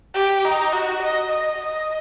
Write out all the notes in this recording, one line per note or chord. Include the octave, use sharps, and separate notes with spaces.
G4
D#4
F#4
D#5
D#5
D#5